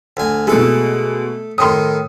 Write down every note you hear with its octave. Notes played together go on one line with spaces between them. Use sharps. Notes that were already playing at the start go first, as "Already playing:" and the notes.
D2 G#5
B2 G#3 A3 A4
A2 D#3 C6 D#6